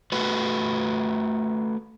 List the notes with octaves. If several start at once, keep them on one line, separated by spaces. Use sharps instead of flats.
A3 F#4 B4